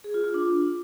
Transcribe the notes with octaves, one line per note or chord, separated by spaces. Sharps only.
G#4
F4
F4
D4